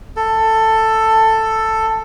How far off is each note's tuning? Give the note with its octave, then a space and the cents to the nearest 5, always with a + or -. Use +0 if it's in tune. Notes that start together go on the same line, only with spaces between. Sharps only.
A4 +10